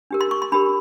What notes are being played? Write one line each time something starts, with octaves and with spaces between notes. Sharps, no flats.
D4 G4 A#4
C6
C#6
C6
D4 G4 A#4 B5